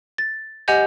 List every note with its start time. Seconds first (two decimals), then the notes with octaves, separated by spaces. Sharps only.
0.18 A6
0.68 G4 D#5 F#5 G#5 G6